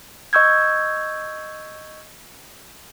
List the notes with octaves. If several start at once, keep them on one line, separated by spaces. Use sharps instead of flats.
D#5 C#6 E6 G6 G#6